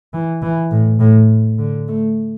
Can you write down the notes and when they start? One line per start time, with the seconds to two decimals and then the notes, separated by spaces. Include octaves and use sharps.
0.13 E3
0.42 E3
0.71 A2
1.00 A2
1.59 D3
1.88 A3